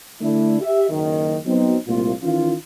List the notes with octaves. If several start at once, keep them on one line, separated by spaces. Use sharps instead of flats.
D3 A3 D4 E4
G4 E5
F#1 D#3
F#3 B3 C4 D#4
C2 A#2 A3 A#3 F4
D#3 E3 C#4 E4 F4